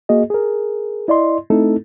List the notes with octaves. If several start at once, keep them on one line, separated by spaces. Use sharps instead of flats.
A#3 F#4 G#4 D#5
G#4 A#4
E4 D5 D#5 C6
A3 C4 D#4 E4 A4